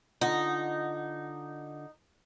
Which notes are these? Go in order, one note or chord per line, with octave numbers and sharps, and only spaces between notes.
D3 D#4 F4 F#5